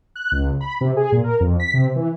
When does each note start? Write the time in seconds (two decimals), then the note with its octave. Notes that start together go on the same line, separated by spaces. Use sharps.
0.16 F#6
0.32 C#2
0.61 B5
0.81 C3
0.97 G#4
1.12 A#2
1.24 A#4
1.40 F2
1.60 B6
1.73 C3
1.96 E3